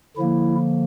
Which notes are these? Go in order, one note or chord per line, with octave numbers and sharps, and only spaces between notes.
D3 F3 A#3 E4